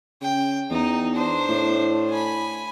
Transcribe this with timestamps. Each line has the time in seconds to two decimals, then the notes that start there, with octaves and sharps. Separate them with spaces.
0.21 C#3 G5
0.71 E2 D#4
1.14 D4 C5
1.49 A2
2.10 G#5 B5